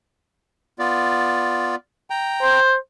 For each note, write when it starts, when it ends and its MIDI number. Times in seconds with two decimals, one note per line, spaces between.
0.79 1.75 59
0.79 1.75 65
0.79 1.75 74
2.10 2.60 79
2.10 2.60 82
2.42 2.75 72